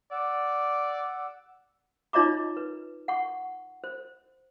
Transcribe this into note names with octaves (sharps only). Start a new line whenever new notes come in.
D5 F#5 D6 E6
D#4 F4 C#5 D#5 A#5 D6
B4
F#5 C#6
C5